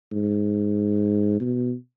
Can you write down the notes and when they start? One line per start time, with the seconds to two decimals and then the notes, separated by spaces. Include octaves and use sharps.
0.12 G#2
1.40 B2